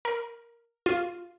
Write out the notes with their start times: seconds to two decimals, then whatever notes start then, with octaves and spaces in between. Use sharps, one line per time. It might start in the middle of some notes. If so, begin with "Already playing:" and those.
0.05 A#4
0.86 F4